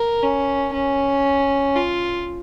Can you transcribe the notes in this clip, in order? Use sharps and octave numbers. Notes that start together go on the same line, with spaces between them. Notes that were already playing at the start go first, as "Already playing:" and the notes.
Already playing: A#4
C#4
C#4
F4